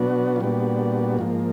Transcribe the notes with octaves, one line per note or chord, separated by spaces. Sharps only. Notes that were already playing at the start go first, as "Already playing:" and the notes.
Already playing: B2 F#3 B3 D4 F#4
F4
A#2 G3 B3 D4 F#4
G#2 F3 A#3